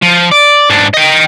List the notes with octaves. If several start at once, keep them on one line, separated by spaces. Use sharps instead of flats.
F3
D5
G#2 D4
D#5 G5